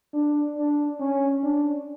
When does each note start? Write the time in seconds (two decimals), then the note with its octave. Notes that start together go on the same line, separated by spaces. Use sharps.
0.14 D4
0.57 D4
1.00 C#4
1.43 D4